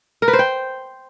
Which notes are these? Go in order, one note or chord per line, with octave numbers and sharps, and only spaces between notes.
A#4
B4
C5
G5